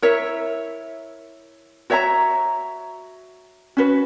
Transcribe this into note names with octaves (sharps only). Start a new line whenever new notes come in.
E4 A#4 C#5 E5
F#4 C#5 E5 A#5
C#4 F#4 B4